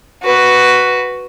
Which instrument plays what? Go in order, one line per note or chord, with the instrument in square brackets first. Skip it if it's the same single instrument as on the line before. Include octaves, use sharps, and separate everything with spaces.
[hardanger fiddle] F#4 B4